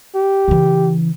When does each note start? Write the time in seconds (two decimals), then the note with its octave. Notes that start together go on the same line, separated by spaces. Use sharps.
0.16 G4
0.48 C#3 E3